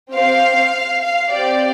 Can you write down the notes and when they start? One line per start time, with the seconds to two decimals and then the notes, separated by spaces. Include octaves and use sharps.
0.13 C4 G4 F5
1.02 F5
1.32 C4 G4 D5